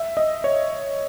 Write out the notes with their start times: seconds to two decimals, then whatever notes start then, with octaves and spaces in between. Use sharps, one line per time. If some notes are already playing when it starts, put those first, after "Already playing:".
Already playing: E5
0.17 D#5
0.44 C#5